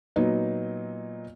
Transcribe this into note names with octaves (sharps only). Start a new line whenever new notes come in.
A#2 F#3 B3 D#4